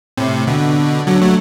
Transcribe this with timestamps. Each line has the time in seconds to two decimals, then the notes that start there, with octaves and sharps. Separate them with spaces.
0.17 A2 C3
0.47 B2 D3
1.07 D3 F#3
1.21 F#3 A3